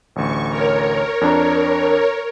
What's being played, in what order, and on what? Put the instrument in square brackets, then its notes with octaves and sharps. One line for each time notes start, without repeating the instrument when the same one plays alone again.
[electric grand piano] A1 D2 [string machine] C#6
[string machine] A#4 C#5
[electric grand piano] F2 D4 A#5